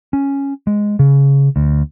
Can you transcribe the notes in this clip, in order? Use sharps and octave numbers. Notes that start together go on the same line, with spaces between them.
C#4
G#3
C#3
D2